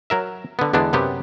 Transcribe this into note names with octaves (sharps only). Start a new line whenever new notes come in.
F#3 A#4 E5
D3 B3
E2 D3 G#3 B3 D4
F#2 C3 B3 G4